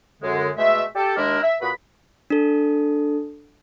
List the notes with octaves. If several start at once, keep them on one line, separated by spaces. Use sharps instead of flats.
F#2 D3 G#3
B2 G#3 A3 E5
G4 A4
D#2 D#3 G#3 D4 E4 A#4
E5
A#2 F#4 G#4 B4 B5
D4 A4